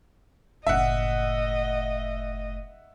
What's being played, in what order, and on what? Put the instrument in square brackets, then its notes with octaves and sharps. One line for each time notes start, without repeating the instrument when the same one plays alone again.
[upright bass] F#1 A2 [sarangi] D#5 [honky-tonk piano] E5 F#5